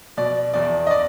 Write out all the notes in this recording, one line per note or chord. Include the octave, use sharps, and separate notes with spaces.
B2 D5
E2 D5
D#5
D5